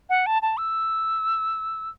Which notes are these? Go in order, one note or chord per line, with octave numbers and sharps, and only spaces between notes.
F#5
A5
A5
E6